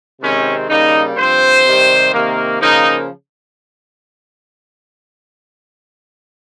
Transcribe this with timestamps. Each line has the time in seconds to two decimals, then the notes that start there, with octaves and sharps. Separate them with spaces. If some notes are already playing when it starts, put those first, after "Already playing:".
0.21 C3 D#3 G#3 C4 C#4
0.69 C#3 G3 A#3 D#4
1.17 G2 F3 C4 C5
1.65 C3 D#3 G3
2.12 C3 D#3 A#3
2.60 C#3 F3 A#3 D#4